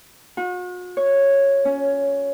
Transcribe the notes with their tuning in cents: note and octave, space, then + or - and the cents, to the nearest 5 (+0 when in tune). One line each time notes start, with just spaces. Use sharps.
F#4 -45
C#5 -5
C#4 +10